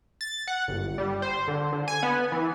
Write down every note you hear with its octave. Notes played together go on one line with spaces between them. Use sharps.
A6
F#5
G1
G3
C5
D3
D3
G#5
B3
E3